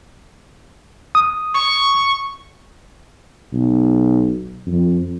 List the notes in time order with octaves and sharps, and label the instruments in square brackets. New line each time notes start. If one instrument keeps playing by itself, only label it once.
[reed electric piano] D#6
[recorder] C#6
[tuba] B1
F2